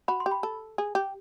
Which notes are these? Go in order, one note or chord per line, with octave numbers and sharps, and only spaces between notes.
F#4 B5
C6
G4
B5
A4
G#4
G4